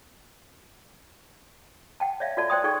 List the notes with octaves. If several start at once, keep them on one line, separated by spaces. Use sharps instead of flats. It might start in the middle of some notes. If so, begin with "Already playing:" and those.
F#5 G5 A5
C#5 D5 E5 F5
F4 F#4 A4 D5 A5
C5 D5 G5 C6 D#6
D#4 G#4 A4 D5 G5 C#6